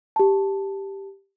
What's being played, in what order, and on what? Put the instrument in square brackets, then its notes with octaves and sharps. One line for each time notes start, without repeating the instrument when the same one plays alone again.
[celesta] G4 A5